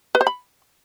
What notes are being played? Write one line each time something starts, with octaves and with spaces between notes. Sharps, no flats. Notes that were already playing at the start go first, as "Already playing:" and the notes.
B4
C5
B5